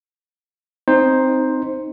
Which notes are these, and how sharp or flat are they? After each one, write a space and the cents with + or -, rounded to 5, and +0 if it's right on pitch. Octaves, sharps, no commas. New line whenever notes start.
C4 +0 D#4 +0 C5 +5